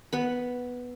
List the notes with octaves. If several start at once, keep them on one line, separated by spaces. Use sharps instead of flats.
B3 B5